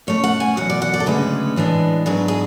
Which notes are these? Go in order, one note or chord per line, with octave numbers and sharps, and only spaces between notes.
B2 A3 C#4 C#5
F#5
G#5
E2 B2 F#3 F#5
D5
F#5
D5
A4
D2 C#3 G#3 C#4 B4
A2 E3 G#3 D4
G#2 F#3 B3 D4 G#4
G#4